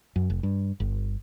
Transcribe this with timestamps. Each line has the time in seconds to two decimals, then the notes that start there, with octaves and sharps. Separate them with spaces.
0.16 F#2
0.30 F1
0.43 G2
0.80 G1